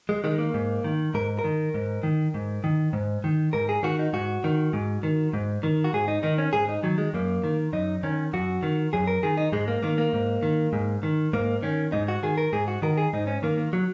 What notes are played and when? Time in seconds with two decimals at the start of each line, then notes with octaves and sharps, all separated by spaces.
0.09 G#3
0.24 D#3 G#3
0.38 A#3
0.54 G#2
0.84 D#3
1.14 G#2 A#4
1.39 A#4
1.44 D#3
1.74 G#2
2.03 D#3
2.34 G#2
2.64 D#3
2.93 G#2
3.24 D#3
3.53 G#2 A#4
3.69 G#4
3.83 D#3 F#4
3.99 D#4
4.13 G#2 F#4
4.44 D#3
4.73 G#2
5.03 D#3
5.33 G#2
5.63 D#3
5.84 F#4
5.93 G#2 G#4
6.08 D#4
6.23 D#3 D#4
6.38 C#4
6.53 G#2 G#4
6.69 D#4
6.83 D#3 F#3
6.98 G#3
7.14 F#2 A#3
7.44 D#3
7.73 F#2 D#4
8.03 D#3 C#4
8.33 F#2 F#4
8.63 D#3
8.93 F#2 G#4
9.07 A#4
9.23 D#3 G#4
9.37 D#4
9.52 G#2 G#3
9.68 A#3
9.83 D#3 A#3
9.98 A#3
10.13 G#2
10.43 D#3
10.73 G#2
11.03 D#3
11.33 G#2 A#3
11.63 D#3 C#4
11.92 G#2 D#4
12.08 F#4
12.23 D#3 G#4
12.37 A#4
12.53 G#2 G#4
12.68 F#4
12.82 D#3 A#4
12.98 G#4
13.13 G#2 D#4
13.27 C#4
13.43 D#3 A#3
13.57 A#3
13.73 F#3